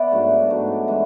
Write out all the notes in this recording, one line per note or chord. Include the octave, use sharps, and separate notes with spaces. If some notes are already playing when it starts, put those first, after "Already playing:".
Already playing: B3 D5 E5 F#5
G#2 F#3 A3 D4
G#2 F#3 A3 D4
E3 G#3